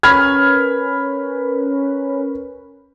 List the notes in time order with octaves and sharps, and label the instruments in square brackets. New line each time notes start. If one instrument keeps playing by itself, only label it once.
[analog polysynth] C#4 A#4 B4 [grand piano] B5 F6 G#6